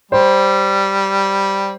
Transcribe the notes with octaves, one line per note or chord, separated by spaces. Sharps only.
G3 C5